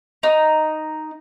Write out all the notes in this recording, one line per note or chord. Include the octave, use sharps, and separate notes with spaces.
D#4